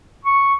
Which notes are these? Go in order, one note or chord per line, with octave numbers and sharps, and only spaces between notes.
C#6